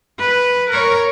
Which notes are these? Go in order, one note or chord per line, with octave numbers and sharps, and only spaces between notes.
B4
A#4 C#5